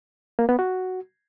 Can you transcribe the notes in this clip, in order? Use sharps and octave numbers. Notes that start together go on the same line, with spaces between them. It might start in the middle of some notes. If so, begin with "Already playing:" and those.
A#3
B3
F#4